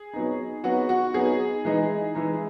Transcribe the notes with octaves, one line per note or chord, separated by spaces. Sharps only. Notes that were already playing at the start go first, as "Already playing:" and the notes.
Already playing: G#4
F#3 B3 D#4
F#3 B3 D#4 F#4
F#4
F#3 B3 D#4 G#4
E3 G#3 D#4
E3 G#3 D#4